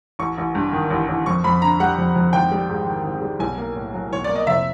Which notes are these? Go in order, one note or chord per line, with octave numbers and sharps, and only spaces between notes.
A1 C#6
A1
G2
D#3
A1
A1
F2 C#6
F2 B5
D3 A#5
G3 F#5
F2
F2
G#1 G5
G3
G#2
D#3
G#1
G3
B1 G#5
A#3
A2
F#3
B1 C#5
A#3 D5
D#5
F1 E5